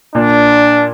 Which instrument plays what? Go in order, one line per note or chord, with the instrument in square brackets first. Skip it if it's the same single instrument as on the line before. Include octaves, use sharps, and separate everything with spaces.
[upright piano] A#2 [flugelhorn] D4